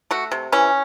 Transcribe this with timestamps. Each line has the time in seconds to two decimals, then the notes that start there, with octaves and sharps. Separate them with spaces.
0.11 A3 F#4
0.31 C3
0.52 E3 C#4